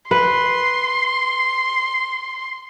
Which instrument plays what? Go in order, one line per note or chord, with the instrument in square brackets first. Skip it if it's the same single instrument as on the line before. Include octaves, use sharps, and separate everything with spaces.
[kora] B4 [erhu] C6